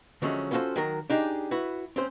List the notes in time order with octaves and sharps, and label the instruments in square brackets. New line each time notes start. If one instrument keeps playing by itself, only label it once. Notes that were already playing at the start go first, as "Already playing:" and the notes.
[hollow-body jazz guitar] D3 F3 F#3 G#3 A3 C#4
B3 C#4 F4 F#4 A4 C5
D#3 F#3 A#4
D4 D#4 G4 G#4
E4 F#4 B4
C4 C#4 C5